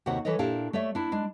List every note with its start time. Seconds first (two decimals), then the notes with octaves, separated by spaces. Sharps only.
0.06 D#2 C3 F#4 C5 C#5 F#5
0.25 E3 A4 B4 C#5 D#5
0.39 A#2 D4 E4 G4 F5 A5
0.73 A3 C#5 D5 E5
0.95 D4 E4
1.12 G#3 D4